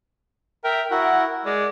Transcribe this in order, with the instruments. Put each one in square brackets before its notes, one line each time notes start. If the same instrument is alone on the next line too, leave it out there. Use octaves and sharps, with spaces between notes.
[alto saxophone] A#4 [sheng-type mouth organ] E5 G5
[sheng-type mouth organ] E4 F#4 A#4 [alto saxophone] F#5
[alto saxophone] G#3 [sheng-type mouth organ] D5